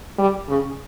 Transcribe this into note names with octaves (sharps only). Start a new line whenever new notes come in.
G3
C#3